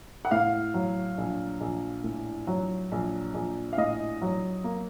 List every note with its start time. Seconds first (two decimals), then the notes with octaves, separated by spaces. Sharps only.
0.25 F#5
0.31 A2 F5
0.74 F#3
1.18 A#1
1.61 A#1
2.04 A2
2.47 F#3
2.92 A#1
3.34 A#1
3.73 F5
3.78 A2 D#5
4.22 F#3
4.64 A#3